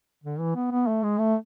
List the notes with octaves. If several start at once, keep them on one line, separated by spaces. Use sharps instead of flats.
D3
E3
B3
B3
A3
G#3
A3